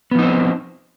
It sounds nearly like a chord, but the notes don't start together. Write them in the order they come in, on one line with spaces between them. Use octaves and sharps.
B3 F3 D#4 C4